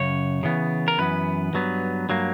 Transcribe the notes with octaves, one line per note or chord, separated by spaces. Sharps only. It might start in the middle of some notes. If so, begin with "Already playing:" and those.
Already playing: F#2 C#3 C#5
C#3 E3 B3
A#4
F#2 E3 B3 B4
G2 F#3 B3
G2 F#3 A#3